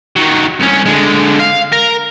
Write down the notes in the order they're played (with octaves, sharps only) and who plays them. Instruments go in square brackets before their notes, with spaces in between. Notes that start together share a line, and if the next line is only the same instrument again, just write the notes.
[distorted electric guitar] D#3 F#3
C2 C#4
D3 G#3
F5
A#4